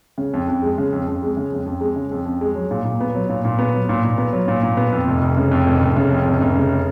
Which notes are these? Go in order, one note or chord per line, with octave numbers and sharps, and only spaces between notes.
C#3
F2
F2
G#3
C#3
F2
F2
G#3
C#3
F2
F2
G#3
C#3
F2
F2
G#3
F#3
A#2
A#2
B3
F#3
A#2
A#2
B3
F#3
A#2
A#2
B3
F#3
A#2
A#2
B3
F2
F1
F1
C#3
F2
F1
F1
C#3
F2
F1
F1
C#3